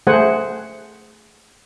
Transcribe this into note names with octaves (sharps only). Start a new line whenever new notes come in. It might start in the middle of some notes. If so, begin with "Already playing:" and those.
A3 G#4 C5 F#5 G#5